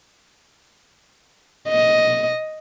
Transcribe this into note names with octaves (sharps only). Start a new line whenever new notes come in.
D#5